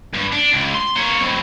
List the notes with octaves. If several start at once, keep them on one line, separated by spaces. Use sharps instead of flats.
G2
D4
C#2
C6
A#3 C#5
F2 A2